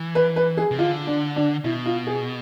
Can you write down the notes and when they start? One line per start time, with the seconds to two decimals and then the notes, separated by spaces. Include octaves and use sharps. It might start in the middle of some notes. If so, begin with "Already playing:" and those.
Already playing: E3
0.15 B4
0.36 B4
0.57 G#4
0.71 C3
0.79 D3 F4
1.07 D4
1.36 D4
1.64 B2 E4
1.86 F4
2.07 G#4